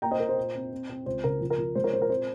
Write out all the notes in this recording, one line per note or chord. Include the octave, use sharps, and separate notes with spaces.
A#3 G5 A#5
C5 D#5
A#3 A#4
C5
A#2
C4
C4
C4
C#2 C5
C#3 A#4
F3
A#4
F3
G#3 C5
A#4 C#5
A#2 C5
A#4
C4 C5